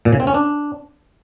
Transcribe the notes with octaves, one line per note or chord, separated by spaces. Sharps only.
A#2
C#3
C4
C#4
D4